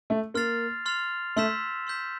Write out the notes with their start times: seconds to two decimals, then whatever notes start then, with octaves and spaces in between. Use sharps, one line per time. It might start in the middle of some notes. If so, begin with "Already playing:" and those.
0.10 A3
0.34 A#3 C6 F6 A6 C7 F7
0.86 C6 F6 A6 C7 F7
1.36 A3 C6 E6 G6 B6 E7
1.87 C6 E6 G6 B6 E7